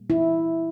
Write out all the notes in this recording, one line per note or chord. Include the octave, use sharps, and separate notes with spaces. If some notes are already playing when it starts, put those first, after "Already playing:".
Already playing: A#2 G3 A#3
E4